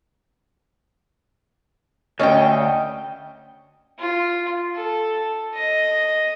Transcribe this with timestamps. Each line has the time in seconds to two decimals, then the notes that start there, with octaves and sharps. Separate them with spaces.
2.20 D2 C#4 D#5 G5
3.99 F4
4.75 A4
5.55 D#5